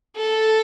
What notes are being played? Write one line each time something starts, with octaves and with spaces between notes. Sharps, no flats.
A4